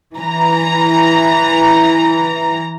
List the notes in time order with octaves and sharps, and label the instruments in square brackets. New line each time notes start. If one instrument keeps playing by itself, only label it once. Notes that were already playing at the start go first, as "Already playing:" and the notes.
[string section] E3 A#5